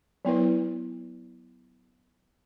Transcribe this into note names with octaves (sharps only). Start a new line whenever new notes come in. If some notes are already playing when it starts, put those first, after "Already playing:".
F#3 B3 E4 B4